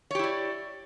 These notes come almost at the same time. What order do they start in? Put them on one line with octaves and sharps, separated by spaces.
C#5 G4 E4 D5